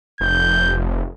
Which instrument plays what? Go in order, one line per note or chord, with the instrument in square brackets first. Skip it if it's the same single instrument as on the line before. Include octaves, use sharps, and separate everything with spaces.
[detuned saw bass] F1 [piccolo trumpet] G6